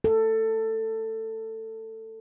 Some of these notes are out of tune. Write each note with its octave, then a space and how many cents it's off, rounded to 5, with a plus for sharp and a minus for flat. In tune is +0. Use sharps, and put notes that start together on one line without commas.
A4 +15